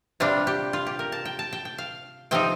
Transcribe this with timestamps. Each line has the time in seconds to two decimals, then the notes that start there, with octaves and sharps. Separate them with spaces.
0.20 C3 G3 D4 F4
0.47 G4
0.73 F4
0.87 G4
0.99 A#4
1.12 A5
1.25 G5
1.39 A5
1.53 G5
1.65 G5
1.78 F5
2.31 C3 F3 C4 D#4 G5